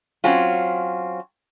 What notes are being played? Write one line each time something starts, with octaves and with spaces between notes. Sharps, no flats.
F#3 C4 C#4 F4